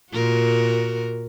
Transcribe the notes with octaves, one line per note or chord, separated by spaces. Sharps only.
A#2 F#4 A#4